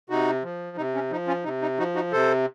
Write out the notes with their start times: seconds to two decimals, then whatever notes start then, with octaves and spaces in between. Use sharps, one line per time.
0.10 C3 D#4 F#4
0.43 F3
0.77 C3 D#4
0.95 C#4
1.11 F3 D#4
1.28 C#4 F4
1.44 C3 D#4
1.62 D#4
1.79 F3 D#4 F#4
1.95 D#4 F#4
2.12 C3 A4 C5